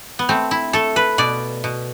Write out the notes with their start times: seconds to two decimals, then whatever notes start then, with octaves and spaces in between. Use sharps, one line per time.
0.19 B3
0.29 A3 C4
0.51 E4
0.73 A3 A4
0.96 B4
1.18 B2 D5
1.64 B2